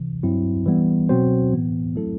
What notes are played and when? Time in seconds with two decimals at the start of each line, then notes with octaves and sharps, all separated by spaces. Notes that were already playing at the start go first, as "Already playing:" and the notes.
Already playing: C3 E3
0.23 G2 F#3 C4 E4
0.66 E3 G3 B3
1.09 B2 F#3 C4 F#4 C5
1.53 A2 E3 B3
1.96 F#3 A3 C4 E4 A4